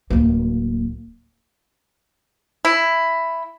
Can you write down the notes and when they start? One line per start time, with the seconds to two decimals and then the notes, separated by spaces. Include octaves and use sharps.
0.10 D1 A#3
2.65 E4